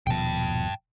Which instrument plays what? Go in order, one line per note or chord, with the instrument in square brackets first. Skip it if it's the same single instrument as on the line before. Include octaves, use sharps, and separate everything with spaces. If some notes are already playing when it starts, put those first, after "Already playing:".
[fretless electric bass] D#1 B2 F3 [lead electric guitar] G5 A5